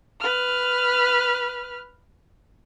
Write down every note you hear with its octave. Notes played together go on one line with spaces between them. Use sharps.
B4 F6